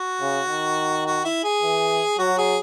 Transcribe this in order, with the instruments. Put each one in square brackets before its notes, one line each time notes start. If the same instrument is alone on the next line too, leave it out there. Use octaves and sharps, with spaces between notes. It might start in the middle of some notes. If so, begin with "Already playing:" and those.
Already playing: [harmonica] F#4
[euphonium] C#3
D#3
[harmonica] F#4
E4
G#4
[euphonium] E3
[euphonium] F#3 [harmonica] F#4
[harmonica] G#4